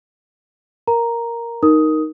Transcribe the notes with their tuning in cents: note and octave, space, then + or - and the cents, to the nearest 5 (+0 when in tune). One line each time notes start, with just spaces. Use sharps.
A#4 +0 A#5 +0
D#4 +0 A#4 +0 D#6 +10